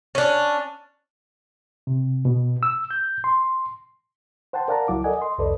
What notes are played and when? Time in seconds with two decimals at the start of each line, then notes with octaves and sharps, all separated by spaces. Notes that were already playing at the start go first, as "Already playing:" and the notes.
0.15 C#4 D4
1.87 C3
2.25 B2
2.63 E6
2.91 G6
3.24 C6
4.53 C5 F#5 G5 A5 C6
4.68 A#4 D5 F5 F#5 A5 A#5
4.88 C#2 F#3 E4 D6
5.04 A4 A#4 D5 D#5 F#5 G#5
5.17 D#5 C6
5.38 C2 F2 A4 B4 D5 D#5